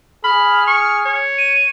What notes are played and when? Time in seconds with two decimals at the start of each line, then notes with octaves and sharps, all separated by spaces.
0.24 G#4 B5 F6
0.67 C#6
1.05 C#5
1.38 D#7